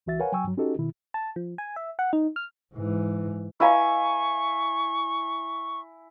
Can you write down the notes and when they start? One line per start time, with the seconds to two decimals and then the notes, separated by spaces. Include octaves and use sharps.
0.06 C#2 E3 F#4 E5 A6
0.19 A#4 B4 C#5 F5 F#5 G#5
0.32 F#3 G5 G#5 C#6 E6
0.44 G2 F#3
0.57 C#4 D#4 F#4 G4 A4 D#5
0.79 B2 D#3 E4
1.14 A5
1.36 F3
1.58 G#5
1.76 E5
1.99 F#5
2.13 D#4
2.36 F6
2.74 G#2 E3
3.60 E4 B4 D#5 F5 G#5 A#5 C#6